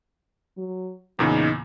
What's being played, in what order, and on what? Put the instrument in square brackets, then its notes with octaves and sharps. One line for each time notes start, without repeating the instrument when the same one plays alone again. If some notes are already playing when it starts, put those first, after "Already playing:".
[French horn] F#3
[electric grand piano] E2 A#2 C#3 [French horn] D#4